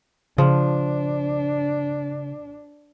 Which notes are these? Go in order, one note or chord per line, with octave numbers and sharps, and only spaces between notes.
C#3 F3 D4